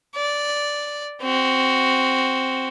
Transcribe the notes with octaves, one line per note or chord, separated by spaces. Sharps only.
D5
C4 F#4